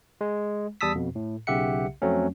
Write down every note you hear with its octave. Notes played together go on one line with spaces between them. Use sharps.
G#3
E2 G3 A5 D#6 E6 B6
F2 B2
A2
B1 C#3 G4 E5 F#5 C#7
F2 F#3 A3 C4 C#4